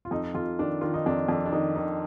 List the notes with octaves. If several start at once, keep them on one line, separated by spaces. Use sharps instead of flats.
F4
F2 D#4
F2 F4
D#3 D4
D#3 F4
D#4
F2 D4
F2 D4
D4
D#3 D#4
D#3 D#4